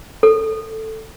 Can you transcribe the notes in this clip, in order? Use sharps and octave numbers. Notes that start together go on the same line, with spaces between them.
A4